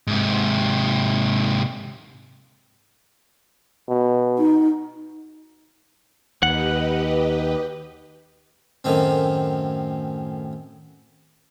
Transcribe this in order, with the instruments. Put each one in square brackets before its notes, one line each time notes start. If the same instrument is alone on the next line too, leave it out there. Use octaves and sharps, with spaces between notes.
[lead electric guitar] G#2 C3
[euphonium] B2
[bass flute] D#4
[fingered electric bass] D#2 [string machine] G4 B4 D#5 [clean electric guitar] F#5
[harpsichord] F#2 A2 D#3 C4